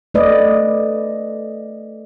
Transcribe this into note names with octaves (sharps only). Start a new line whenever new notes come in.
A3 B4 D5 D#5